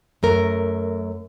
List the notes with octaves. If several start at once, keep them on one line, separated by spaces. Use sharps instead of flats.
F#2 A3 A#4